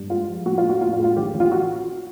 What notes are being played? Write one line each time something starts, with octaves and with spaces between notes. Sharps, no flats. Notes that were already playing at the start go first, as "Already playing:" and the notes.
Already playing: G2
G#3 F4
F3
A2 F#4
F4
A2
F#4
A2 F4
F4
G#3
F4
A1 G4
A1
F4
F#4